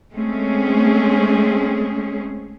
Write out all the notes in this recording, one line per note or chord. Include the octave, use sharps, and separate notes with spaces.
G#3 A3 C4 C#4 G#4